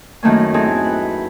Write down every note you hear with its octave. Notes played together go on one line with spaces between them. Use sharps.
F#2 A2 D#3 A3 A#3 C#4
B3 C4 D#4 E4 G#4 A4
B4